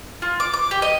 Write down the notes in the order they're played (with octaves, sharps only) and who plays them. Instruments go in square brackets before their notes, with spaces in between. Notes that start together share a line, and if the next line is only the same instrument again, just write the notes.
[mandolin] F4
D6
D6
G4
D#5